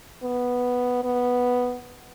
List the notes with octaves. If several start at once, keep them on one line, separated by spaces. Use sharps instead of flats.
B3
B3